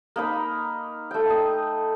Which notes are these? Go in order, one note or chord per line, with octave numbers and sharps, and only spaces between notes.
A#3 D#4 B5
A3 G5
D#5